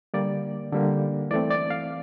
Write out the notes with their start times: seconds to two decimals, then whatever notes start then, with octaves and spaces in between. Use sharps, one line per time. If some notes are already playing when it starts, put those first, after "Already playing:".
0.14 D3 G3 A#3 D5
0.73 D3 G3 A#3
1.31 E3 A3 C4 D5
1.51 D5
1.70 F5